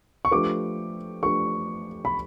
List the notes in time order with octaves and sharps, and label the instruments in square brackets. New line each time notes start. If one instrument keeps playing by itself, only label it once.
[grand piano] C#6
[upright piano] F3 A3 D4 G4 B4 [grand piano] D6
[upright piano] F3 A3 D4 G4 B4 [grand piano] C#6
[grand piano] B5